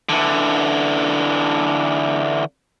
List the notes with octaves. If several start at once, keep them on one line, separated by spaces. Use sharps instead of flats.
D3 E3